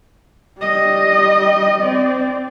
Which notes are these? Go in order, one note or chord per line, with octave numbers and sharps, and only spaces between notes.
G3 D#5
C4 D5